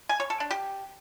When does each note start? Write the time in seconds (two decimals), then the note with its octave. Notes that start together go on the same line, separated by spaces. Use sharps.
0.09 G#5
0.20 C#5
0.30 A4
0.40 D4
0.51 G4